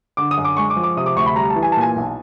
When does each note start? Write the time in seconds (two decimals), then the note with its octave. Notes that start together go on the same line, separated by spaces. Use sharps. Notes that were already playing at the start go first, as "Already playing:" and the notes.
0.17 D3 D6
0.31 D#6
0.37 F#2
0.45 D6
0.57 G#3 C#6
0.70 D6
0.76 F3
0.83 D6
0.97 C3 D#6
1.06 D6
1.16 D2 C#6
1.26 B5
1.36 G3 A#5
1.50 A5
1.56 E3
1.63 G#5
1.72 A5
1.77 A#2 G#5
1.96 B1